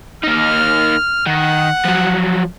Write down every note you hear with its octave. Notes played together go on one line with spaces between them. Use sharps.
A#3 D#4 F6
D#3 F#5
F3 F#3